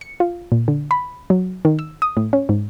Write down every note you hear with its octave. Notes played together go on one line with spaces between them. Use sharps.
C#7
F4
A#2
D3
B5
F#3
D#3
E6
D#6
A2
C#4
G#2